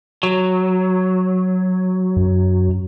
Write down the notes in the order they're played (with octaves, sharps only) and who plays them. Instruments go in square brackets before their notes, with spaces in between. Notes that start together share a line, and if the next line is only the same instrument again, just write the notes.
[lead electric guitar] F#3
[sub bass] F#2